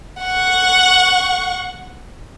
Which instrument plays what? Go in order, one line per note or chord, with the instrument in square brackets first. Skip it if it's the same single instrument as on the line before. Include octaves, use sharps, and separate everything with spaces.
[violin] F#5 C#6